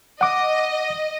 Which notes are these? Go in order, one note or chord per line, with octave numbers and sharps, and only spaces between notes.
D#5 F#5 D6